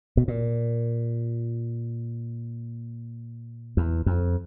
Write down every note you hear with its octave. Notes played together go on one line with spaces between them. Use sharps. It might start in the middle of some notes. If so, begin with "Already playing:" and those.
B2
A#2
E2
F2